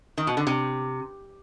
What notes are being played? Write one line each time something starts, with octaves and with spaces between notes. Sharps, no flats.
D#3
B2
D3
C3